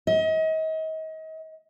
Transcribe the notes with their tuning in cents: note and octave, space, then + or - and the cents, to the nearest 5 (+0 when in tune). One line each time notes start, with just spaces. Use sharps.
D#5 +35